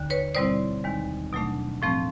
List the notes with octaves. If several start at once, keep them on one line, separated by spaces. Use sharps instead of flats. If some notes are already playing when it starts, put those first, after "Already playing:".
Already playing: D#2 D3
B4 C#5
B2 G3 C4 E4 C5 D5
D#2 D#3 G#3
B2 F#3 A3 D4
A2 F3 A3 C4